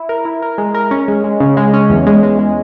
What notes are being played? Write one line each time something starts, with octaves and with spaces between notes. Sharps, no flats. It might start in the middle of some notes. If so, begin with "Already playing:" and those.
Already playing: E4
A#4
E4
A#4
G#3
A#4
C#4
G#3
G#3
C#3
G#3
C#4
E2
G#3
G#3
G#3